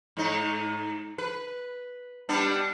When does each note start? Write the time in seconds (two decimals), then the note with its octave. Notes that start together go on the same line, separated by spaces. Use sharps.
0.17 G#2 D#4
1.18 B4
2.29 G3 B3 D4